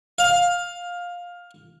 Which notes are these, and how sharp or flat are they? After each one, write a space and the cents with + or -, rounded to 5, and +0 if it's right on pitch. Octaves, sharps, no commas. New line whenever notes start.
F5 +15